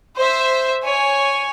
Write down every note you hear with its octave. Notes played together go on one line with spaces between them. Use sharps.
C5 E5
C#5 G#5